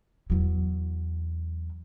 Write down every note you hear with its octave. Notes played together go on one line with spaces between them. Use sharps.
E2 F#3